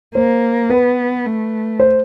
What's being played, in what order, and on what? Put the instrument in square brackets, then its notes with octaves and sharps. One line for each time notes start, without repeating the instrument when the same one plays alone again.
[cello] A#3 [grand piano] C5
[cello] B3 [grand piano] B4
[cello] A3
[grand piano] C5